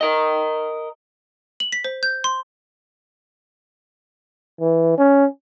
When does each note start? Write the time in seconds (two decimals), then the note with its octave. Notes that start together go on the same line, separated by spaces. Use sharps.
0.01 A#4 D#5
1.60 F#7
1.72 B6
1.84 C5
2.03 G6
2.24 C6
4.60 E3
4.98 C#4